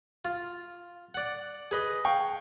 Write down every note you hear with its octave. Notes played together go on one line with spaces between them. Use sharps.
F4
D5 F#5
G#4 B4 D#5
F5 G5 C#6